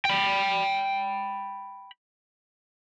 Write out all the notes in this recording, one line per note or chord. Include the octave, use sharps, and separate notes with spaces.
G5 B5